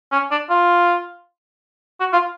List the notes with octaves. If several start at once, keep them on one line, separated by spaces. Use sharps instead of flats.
C#4
D4
F4
F#4
F4